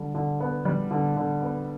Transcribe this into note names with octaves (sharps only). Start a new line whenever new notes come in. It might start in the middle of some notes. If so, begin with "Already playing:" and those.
Already playing: D3 G3
D3
B3
G3
D3
D3
B3